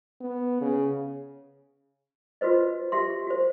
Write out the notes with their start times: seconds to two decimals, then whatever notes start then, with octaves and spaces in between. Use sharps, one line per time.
0.21 B3
0.61 C#3
2.41 F4 F#4 B4 C5 D#5
2.92 F#4 G4 E5 C6
3.27 F#4 C5